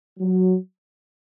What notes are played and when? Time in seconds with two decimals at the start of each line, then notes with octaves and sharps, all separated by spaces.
0.19 F#3